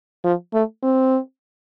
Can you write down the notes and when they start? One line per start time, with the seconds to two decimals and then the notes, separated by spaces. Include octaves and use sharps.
0.24 F3
0.54 A3
0.83 C4